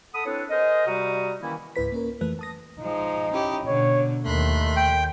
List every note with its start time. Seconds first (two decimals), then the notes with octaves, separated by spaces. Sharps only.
0.14 A4 F#5 B5 D#6
0.26 C4 D4 E4 A4 B4 C#5
0.50 G#4 A#4 C5 D#5
0.86 C3 G3 F#4 F#5 A#5 D#6
1.42 D#3 E3 A#3 C#4 E4
1.76 C#2 G#2 E4 B4 B6
1.92 A#3 C#4 A#4
2.21 F2 E3 A3 B4 F#6
2.39 A5 D#6 A#6
2.81 F3 G#3 D#4
3.32 C#4 E4 G4
3.67 B2 D3 C#5
4.25 D#2 D#3 A3 B5 C6 F#6
4.77 G5